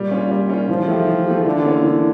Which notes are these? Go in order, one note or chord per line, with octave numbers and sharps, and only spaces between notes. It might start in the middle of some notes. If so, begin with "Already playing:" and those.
Already playing: A#2 G3
C#4 F4
G3
C#4 F4
E3 F3
A3 E4 G4
E3
A3 E4 G4
D3 E3
A#3 C#4 F4
E3